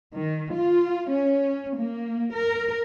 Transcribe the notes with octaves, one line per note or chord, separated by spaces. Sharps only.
D#3
F4
C#4
A#3
A#4